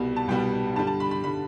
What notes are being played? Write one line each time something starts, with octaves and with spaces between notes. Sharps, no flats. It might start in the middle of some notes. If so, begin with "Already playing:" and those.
Already playing: C2 B2 G3 B3
A5
C2 B2 G3 B3 G5
G2 D3 G3 A5
A5
B5
B5
D3 G3 B5